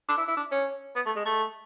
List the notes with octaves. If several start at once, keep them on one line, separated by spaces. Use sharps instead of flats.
D4
E4
E4
D4
C#4
B3
A3
G#3
A3